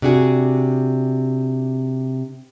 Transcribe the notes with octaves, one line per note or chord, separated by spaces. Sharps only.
C3 D4 F#4 G#4